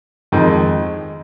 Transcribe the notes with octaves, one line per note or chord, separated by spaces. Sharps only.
F2 D#3 G#3